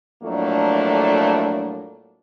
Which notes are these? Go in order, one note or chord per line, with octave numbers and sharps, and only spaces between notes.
F2 A2 F#3 A3 A#3 D4